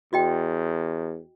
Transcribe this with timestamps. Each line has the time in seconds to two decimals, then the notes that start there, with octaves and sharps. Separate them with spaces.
0.13 E2 F#4 D#5 G5